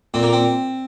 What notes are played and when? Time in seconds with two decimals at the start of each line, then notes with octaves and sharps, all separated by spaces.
0.14 A#2 C4
0.23 A#3
0.33 C4